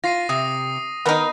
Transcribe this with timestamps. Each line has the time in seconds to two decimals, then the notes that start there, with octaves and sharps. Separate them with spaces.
0.04 F4 A#6 C7 D#7
0.29 C3 D#6
1.06 D#3 B3 D#4 A#4